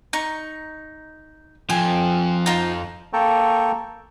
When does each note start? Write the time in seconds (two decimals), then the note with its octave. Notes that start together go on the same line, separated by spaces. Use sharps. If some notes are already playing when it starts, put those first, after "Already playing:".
0.13 D#4 C#6
1.70 F2 F3 G5 G#5
2.46 D#4 F4 C5
3.13 A#3 A4 G5 A5 A#5 C#6